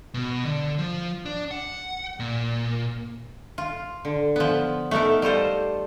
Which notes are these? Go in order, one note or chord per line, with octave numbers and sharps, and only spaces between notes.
B2
D3
F3
D4
F#5
A#2
F4
D3
F3 B3
A3 B3 D#4 A4 A#4
G3 F4 A4 C5